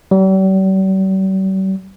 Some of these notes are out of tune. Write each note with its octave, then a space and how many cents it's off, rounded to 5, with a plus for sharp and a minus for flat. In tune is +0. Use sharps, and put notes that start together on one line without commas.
G3 -45